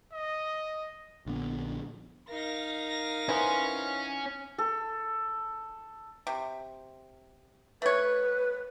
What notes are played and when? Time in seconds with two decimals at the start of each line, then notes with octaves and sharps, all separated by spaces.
0.13 D#5
1.26 A#1 D3 B3
2.28 D#4 A#4 F5 A#6
3.29 E3 B3 C#4 C5
4.58 A4
6.27 C3
7.82 A3 B4 C#5